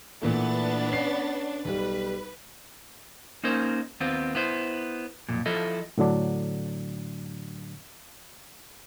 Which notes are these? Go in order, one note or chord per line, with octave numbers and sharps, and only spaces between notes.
A#2 E3 A3 B3 D4 A6
C#4 C7
B1 G3 B4
A#3 C#4 D#4 A#4 C5
D#2 B3 C4 F4
B3 E4 C5
B1 F2 A#2
F3 E4 F4 A4 D#5
A2 D3 F#3 D4